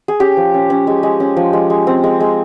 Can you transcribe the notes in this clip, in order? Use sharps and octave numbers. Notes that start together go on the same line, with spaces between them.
G#4
C#4 G4
F3
C#4
C#4
G#3
G#3
C#4
F3
G#3
G#3
C4
G#3
G#3